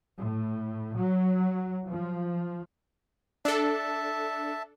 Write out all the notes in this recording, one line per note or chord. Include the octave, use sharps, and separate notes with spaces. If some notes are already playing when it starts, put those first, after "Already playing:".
A2
F#3
F3
D4 A4 E5 A5